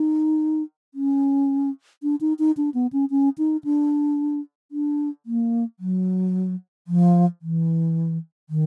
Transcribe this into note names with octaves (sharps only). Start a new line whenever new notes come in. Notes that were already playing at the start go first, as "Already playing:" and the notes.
Already playing: D#4
C#4
D4
D#4
D#4
D4
B3
C#4
C#4
D#4
D4
D4
A#3
F#3
F3
E3
D#3